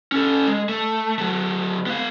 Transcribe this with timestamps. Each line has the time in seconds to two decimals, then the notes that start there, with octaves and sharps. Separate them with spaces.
0.12 C#4 A4
0.48 G#3
0.69 A3
1.18 F#3 A3
1.86 B3 F5